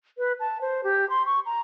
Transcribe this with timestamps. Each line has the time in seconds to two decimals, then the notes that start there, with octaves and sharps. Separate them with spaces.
0.18 B4
0.40 A5
0.61 C5
0.84 G4
1.10 C6
1.26 C#6
1.46 A#5